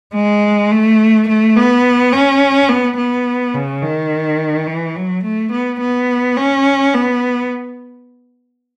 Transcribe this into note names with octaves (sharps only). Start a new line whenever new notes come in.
G#3
A3
A3
B3
C#4
B3
B3
C#3
D#3
E3
F#3
A3
B3
B3
C#4
B3